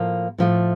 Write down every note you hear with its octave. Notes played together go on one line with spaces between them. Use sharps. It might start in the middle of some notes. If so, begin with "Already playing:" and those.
Already playing: A2 F3 A#3
A2 F3 A3